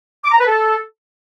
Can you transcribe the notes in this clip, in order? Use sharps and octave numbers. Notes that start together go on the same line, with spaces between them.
D6
A#5
B4
A4